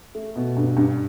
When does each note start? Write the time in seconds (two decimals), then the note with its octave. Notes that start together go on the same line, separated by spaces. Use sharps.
0.15 A3
0.36 B2
0.57 G2
0.77 G2